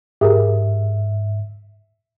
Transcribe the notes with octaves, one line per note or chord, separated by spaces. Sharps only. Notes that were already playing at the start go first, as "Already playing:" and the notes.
G#2 G4 G#4 A#4 E5